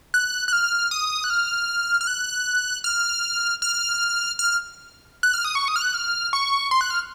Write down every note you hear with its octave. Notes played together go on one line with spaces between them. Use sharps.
F#6
F#6
F6
D#6
F#6
F6
F6
F#6
F6
F6
F6
F#6
F6
D#6
C#6
D#6
F6
F#6
F6
C#6
C6
F#6
F6